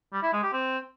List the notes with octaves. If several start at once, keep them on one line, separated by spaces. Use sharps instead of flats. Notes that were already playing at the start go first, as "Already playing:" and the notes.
G3
E4
G#3
G4
C4